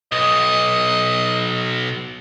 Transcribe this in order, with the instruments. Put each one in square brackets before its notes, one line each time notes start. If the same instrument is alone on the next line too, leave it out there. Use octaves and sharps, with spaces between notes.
[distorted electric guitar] B1 [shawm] D#5